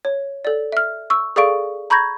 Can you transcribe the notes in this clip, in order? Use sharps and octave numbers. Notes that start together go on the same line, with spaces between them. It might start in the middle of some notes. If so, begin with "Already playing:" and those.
C#5
A4 D5
E5 F6
C#6 E6
G#4 A4 D5 F5 C#6 D7
A#5 B5 C#6 G6 G#6 A#6